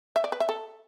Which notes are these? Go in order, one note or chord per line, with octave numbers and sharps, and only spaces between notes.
E5
D5
B4
E5
A4